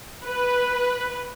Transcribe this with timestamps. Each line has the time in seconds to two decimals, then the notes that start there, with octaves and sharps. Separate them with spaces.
0.25 B4